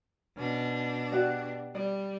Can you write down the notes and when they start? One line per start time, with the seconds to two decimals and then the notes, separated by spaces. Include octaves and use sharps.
0.37 B2 C#4 D4
1.12 F#4 G4 D5
1.75 G3 D5